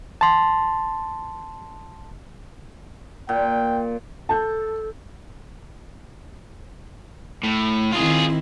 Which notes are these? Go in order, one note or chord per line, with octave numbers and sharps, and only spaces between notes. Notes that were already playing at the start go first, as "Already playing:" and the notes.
A5 C6
A#2 G5
A4 A5 G6
A2
D#3 C4 E4 F4 G#4